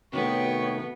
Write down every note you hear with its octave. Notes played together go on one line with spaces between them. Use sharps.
C3 D#3 A3 B3 F#4 C#5 G5 C#6